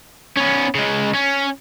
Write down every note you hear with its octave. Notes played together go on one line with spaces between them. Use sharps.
B3 C#4
C#3 G#3
C#4